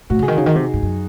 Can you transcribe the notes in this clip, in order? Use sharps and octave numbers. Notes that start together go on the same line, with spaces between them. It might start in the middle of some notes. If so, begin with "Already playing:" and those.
A2 F#4
C#3 G#4
D#3
C#3 D#4 F#4
D#3
C3
G#2
F#2